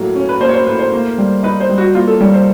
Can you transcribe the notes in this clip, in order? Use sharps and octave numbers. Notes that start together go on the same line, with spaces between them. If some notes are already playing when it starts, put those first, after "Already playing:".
Already playing: A2 F#3 A#3
C#4
B4
A#3 C5
C#5
C5
A2 B4
C5
A#3
G3
D#4 B4
C5
G3
F#4
A#3 F4
A4
G3 C#5
C5